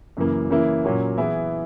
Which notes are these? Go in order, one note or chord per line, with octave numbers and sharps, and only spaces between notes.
F#2 C#3 E3 A#3
C#3 E3 A#3 E4
A#2 F#3 A#3 C#4
E3 B3 E4 G#4